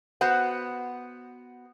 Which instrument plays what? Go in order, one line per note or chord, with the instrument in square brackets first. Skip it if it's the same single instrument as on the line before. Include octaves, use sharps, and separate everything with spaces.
[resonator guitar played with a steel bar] B3 F#4 C5 F#5